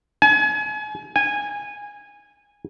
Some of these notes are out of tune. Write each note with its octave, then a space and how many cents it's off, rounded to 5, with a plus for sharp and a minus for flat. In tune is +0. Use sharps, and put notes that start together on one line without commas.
G#5 +35
G#5 -15